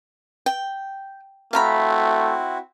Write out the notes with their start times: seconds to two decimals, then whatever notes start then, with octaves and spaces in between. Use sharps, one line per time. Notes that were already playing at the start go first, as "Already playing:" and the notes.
0.46 G5
1.53 A3 C4 E4 F#4 F5 A#5 B5